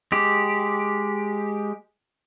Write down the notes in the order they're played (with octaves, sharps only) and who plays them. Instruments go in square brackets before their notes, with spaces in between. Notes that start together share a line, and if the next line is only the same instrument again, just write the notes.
[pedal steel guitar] G#3 G4